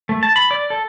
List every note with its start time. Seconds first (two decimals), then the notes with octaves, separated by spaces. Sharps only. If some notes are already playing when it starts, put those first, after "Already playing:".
0.09 A3
0.23 A5
0.36 B5
0.51 D5
0.70 A4